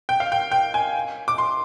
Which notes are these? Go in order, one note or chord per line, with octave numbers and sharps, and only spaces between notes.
G5
F5
G5
G5
G#5
D6
C6